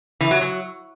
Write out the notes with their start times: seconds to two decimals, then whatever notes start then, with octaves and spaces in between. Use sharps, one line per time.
0.21 E3
0.31 F#3
0.41 F#3